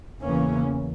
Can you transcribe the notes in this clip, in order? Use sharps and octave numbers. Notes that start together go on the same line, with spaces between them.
E2 C#3 E3 A#3 C#4